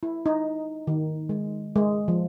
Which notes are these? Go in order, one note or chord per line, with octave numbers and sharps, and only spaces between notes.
E4
D#4
D#3
G#3
G#3
F3